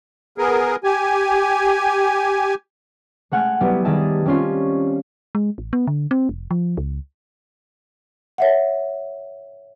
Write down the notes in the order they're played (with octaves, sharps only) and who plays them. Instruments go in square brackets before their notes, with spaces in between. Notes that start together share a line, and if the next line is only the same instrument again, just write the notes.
[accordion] B3 G#4 A#4
G4 G#5
[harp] G#3 A3 F#5 G#5 F6
F#3 G3 B3 E4
D#3 G3 G#4 D#5 E5 A5
G3 C4 C#4 F4
[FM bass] G#3
A1
B3
D3
C4
F1
F3
C#2
[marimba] C#5 E5 F#5